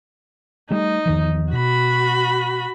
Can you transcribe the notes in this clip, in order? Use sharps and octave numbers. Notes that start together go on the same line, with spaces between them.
G3 A3 D#4
E2 D#3 F3
B2 F#4 B5